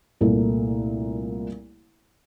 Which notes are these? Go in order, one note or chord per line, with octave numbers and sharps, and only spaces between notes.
C2 A#2 A3